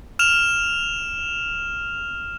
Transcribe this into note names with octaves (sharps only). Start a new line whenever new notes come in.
F6 E7 F7